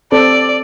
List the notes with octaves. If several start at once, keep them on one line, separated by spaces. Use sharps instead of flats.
C4 A4 C5 D5